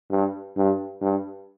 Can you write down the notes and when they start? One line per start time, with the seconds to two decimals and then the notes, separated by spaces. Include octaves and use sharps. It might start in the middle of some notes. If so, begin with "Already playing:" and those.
0.10 G2
0.57 G2
1.01 G2